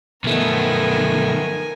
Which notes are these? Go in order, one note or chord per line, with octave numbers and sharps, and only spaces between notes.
B1 D#3 F3 A3 B3 A#4 G#5